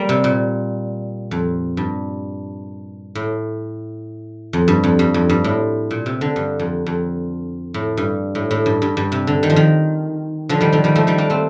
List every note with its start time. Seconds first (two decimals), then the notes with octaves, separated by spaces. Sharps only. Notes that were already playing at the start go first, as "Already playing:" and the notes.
Already playing: G3 A#3
0.09 C3
0.24 A#2
1.31 F2
1.77 G2
3.15 A2
4.53 F2
4.68 G2
4.84 F2
4.99 G2
5.14 F2
5.30 G2
5.44 A2
5.91 A#2
6.06 C3
6.21 D3
6.36 G2
6.59 F2
6.86 F2
7.74 A2
7.97 G2
8.35 A2
8.51 A2
8.66 G2
8.82 G2
8.97 G2
9.12 C3
9.27 D3
9.43 D#3
9.50 F3
9.56 D#3
10.49 D3 F3
10.61 D#3 G3
10.72 D3 F3
10.84 D#3 G3
10.95 F3 A3
11.07 D#3 G3
11.18 A#3 D4
11.30 A3 C4